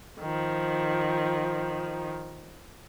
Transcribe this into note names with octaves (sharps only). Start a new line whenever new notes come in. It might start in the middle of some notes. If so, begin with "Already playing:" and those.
D#3 F3